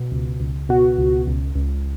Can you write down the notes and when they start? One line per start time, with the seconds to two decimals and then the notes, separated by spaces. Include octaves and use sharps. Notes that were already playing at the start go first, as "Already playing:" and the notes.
Already playing: B2
0.11 C#2
0.40 C#2
0.69 B2 F#4
0.98 C#2
1.27 C#2
1.55 C#2